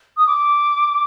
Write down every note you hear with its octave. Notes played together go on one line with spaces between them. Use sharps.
D#6
D6